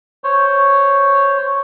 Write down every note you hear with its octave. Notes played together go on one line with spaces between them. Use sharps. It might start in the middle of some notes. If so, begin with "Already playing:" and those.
C5 C#5